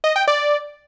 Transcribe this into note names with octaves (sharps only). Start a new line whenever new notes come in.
D#5
G5
D5